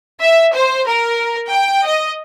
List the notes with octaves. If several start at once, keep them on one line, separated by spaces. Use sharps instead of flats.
E5
C5
A#4
G5
D#5